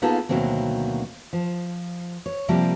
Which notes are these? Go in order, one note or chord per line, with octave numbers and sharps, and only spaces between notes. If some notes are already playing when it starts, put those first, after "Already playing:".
A#3 B3 D#4 F4 G#4 A4
D2 B2 D#3 F#3 A#3 C4
F3
C#5
C3 F3 G3 A#3